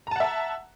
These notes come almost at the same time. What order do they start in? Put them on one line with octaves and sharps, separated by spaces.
A#5 A5 F#5 E5